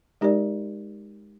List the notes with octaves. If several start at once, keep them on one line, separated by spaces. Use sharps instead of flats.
G#3 D#4 G4 A#4 D5